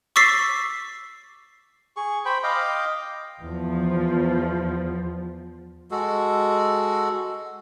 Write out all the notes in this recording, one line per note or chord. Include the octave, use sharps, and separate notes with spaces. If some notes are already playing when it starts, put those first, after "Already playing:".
C#6 D6 E6 A6 B6 C7
G#4 C#6
C5 G5 B5
D#5 F5 G5 D6
E2 F3
G#3 F#4 A4